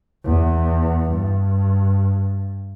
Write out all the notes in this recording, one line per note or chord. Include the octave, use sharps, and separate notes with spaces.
E2
G2